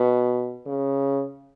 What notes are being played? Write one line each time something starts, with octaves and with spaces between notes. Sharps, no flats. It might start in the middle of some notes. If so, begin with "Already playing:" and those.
Already playing: B2
C#3